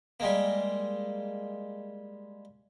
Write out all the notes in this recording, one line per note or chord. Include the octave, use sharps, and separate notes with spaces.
G3 G#3 A#3